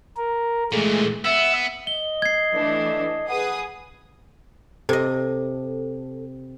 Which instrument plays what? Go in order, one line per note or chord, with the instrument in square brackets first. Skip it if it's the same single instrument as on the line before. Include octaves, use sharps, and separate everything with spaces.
[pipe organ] A#4
[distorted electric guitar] A#2 E3 [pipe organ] G#3 A3
[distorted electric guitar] B3 [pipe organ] E5 E6
[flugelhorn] D#5 [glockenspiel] G7
[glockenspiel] G#6 C7
[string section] E3 A3 D4
[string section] G#4 B4 D#6 [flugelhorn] F#5
[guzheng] C3 D#5 [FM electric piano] A4